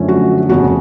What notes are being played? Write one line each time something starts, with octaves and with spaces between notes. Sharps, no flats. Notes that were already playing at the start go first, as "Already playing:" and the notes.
Already playing: F#2 D3 F3 A3 C#4
F#4
F1 F2 C#3 F#4